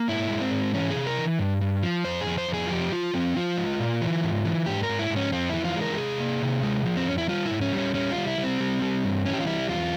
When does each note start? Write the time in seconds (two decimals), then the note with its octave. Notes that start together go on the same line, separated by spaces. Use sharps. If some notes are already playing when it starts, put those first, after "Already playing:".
Already playing: A#3
0.08 G#2 E4
0.31 G#3
0.41 C4
0.52 G#2
0.74 E3 C#4
0.90 G#4
0.96 C3
1.07 A#4
1.17 E3
1.39 G2
1.61 G2
1.83 F3
2.05 F2 C5
2.21 G#4
2.27 F2
2.38 C5
2.48 F2
2.54 G#4
2.66 F4
2.70 F3 G4
2.92 F3 F4
3.13 F3 C4
3.36 F3 F4
3.57 G#3
3.80 A#2
4.02 E3
4.23 G#2
4.45 E3
4.66 G#2 G4
4.83 A#4
4.89 G#2
4.99 E4
5.10 G#2
5.16 C#4
5.32 F2 C4
5.49 E3 E4
5.65 F4
5.76 G#3
5.82 A#4
5.93 G4
5.98 C3 G#4
6.20 A#3
6.42 C3
6.63 G#3
6.85 F3
6.97 C4
7.07 F2 C#4
7.18 E4
7.28 G3 F4
7.46 E4
7.51 G#2
7.61 C#4
7.73 G3 C#4
7.94 G3 C#4
8.11 F4
8.16 G3
8.27 E4
8.37 G3
8.43 C4
8.60 G3
8.82 G3
9.04 G2
9.26 E3 C#4
9.33 G4
9.41 F4
9.47 G3 E4
9.69 E2 F4